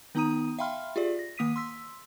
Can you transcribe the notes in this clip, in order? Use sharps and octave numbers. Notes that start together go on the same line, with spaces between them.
D#3 B3 D#4 A#5 D#6 D#7
E5 F5 G5 B5 C6 F6
F4 G4 G#4 D5
A#6
D#3 A#3 D#6 B6 D#7
C6 E6 B6